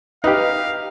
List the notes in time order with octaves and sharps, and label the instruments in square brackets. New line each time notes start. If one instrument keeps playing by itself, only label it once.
[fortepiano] D#4 G4 [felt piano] B4 [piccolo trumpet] F5